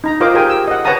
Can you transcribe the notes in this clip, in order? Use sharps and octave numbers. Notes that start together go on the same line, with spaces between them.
D#4 A#5
F4 A#4 C5 D#5 F5 D6
G4 G#4 A#4 G5 G#5
E6
D#5 F#5
B4 C#5 F#5 A5 A#5 D#6